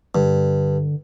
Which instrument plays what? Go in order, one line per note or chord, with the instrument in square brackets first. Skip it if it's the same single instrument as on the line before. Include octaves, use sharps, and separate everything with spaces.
[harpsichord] G2 [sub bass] D3